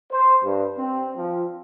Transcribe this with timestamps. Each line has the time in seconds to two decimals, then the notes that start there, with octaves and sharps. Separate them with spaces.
0.12 C5
0.44 G2
0.78 C4
1.16 F3